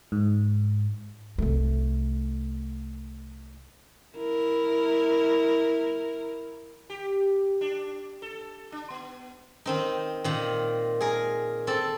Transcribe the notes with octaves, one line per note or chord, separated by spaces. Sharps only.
G#2
C2 A3
E4 A#4
G4
D4
A4
D4
B3
D#3 C4 D#4
A#2 D#3
G#4 A#4
C4 A4 D5